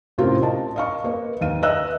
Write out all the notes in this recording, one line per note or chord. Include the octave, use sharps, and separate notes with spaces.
A2 C3 C#4 F4 A#4 C5
A#4 D#5 A5
D#5 F5 C#6
A#3 B4 D#5
D#2 F5 D#7
B4 D#5 E5 E6 F#6